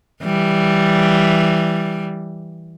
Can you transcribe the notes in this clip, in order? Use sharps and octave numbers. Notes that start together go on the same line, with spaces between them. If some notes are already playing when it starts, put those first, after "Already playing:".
E3 G3